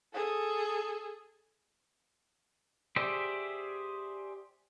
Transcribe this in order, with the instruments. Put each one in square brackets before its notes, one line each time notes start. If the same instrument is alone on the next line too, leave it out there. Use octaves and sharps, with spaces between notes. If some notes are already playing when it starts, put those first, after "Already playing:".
[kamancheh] G#4 A4
[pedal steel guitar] G4 G#4 C5 D5 E5